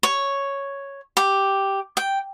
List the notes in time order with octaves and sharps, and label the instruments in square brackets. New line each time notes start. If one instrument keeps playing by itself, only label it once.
[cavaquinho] C#5
G4
G5